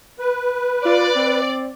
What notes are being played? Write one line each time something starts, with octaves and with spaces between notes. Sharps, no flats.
B4
F4 D5
C4